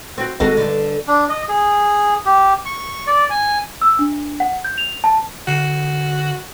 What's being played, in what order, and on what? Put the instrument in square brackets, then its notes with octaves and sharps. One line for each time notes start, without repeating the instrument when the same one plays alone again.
[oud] C4 F#4
[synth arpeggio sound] G#1 [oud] G#3 F#4 A4
[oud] G2 D3
[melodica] D4
D#5
G#4
G4
C#6
D5
G#5
[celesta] E6
D4
F#5
G6
F7
A5
[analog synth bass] D3 [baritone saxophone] F#4